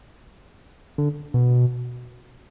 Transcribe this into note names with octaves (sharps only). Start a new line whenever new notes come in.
D3
B2